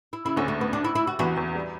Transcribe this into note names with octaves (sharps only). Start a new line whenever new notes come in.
E4
C#3 E4
D2 D3 C#4
A3
B3
D4
E4
E4
F#4
E2 E3 F#4
E2 E3
G3